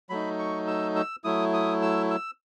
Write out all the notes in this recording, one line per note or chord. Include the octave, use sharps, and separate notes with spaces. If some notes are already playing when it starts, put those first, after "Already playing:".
F#3 A3 D#4 B5
C#6
E6
E6
F#3 A3 E4 D#6
D#6
E6
E6